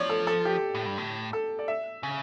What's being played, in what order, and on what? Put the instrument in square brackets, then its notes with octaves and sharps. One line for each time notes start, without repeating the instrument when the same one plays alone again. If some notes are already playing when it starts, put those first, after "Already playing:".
Already playing: [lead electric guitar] F3 [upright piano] C#5 D5
[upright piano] A4
A4
G4
[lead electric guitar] A2
G2
A2
[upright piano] A4
D5
E5
[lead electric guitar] C#3